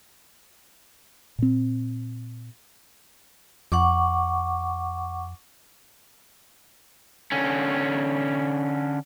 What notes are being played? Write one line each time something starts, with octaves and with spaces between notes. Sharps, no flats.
A#2 C4
F2 F#5 C#6 D6
D3 C#4